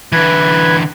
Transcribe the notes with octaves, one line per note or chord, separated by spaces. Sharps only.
D3 E3 B4 G#6